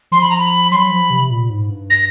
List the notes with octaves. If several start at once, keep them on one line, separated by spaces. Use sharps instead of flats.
F3 C6
B5
A#5
B5
F#3 B5 C6
F3
C3
A#2
G#2
G2
A#6